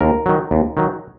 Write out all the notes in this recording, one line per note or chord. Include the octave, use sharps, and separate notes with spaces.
D#2 A#4
D#3 F#3
D#2
D#3 F#3